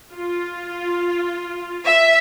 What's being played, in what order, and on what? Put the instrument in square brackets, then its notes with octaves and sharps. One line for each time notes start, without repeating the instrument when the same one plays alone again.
[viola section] F4
[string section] E5